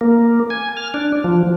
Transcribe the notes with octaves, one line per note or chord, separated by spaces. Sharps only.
A#3
G#5
F6
D4
F3